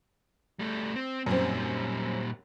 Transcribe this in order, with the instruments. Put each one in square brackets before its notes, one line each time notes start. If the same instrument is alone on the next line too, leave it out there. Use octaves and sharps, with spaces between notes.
[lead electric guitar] G3 A3
C4
[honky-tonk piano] F#2 C4 [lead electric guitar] A#2 G3